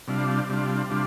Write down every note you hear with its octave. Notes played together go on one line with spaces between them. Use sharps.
C3 G3 D4 F4
C3 G3 D4 F4
C3 G3 D4 F4